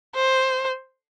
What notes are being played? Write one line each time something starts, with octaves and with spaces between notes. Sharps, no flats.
C5